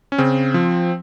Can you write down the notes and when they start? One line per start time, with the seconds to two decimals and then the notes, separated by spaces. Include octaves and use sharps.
0.12 C#4
0.18 C#3 C4
0.54 F3